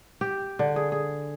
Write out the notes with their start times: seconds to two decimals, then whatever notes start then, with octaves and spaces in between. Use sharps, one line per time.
0.21 G4
0.59 D3
0.76 G#4
0.92 G#4